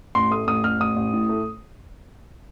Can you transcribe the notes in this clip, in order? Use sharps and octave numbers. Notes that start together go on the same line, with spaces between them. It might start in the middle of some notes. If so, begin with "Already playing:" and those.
A1 C6
A3 D#6
A1 D#6
A1 F6
A1 D#6
A1
A2
A3